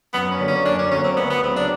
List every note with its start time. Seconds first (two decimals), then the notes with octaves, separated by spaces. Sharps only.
0.13 F#2 B3
0.31 C#4
0.40 D3 F#3 A#3
0.48 C#4
0.65 F#2 D4
0.79 C#4
0.91 D3 F#3 A#3 C#4
1.04 C4
1.17 D2 B3
1.30 B3
1.42 C#3 F#3 C4
1.56 D4